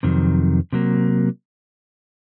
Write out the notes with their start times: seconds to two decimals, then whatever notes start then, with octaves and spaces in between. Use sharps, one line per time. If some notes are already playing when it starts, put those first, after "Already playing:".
0.03 F2 C3 D#3 F#3
0.73 C3 F#3 A#3